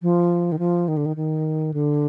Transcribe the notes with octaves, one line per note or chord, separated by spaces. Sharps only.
F3
D#3
F3
D#3
D3
D#3
D#3
D3